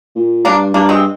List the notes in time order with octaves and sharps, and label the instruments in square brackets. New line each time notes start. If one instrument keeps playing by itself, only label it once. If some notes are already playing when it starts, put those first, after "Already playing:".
[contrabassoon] A#2
[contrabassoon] G2 [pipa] A#3 D4
[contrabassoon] G2 [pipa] A#3 D4
[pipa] G#3 C4